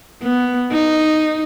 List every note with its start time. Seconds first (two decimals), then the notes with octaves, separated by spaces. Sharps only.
0.22 B3
0.72 D#4